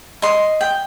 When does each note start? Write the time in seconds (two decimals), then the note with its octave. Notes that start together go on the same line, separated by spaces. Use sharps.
0.22 D#5 C6
0.61 G5